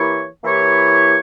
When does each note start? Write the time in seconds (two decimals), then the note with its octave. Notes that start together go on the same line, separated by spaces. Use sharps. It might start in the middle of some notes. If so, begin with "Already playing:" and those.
Already playing: E3 A#3 E4 G4 C#5
0.44 E3 A#3 E4 G4 C#5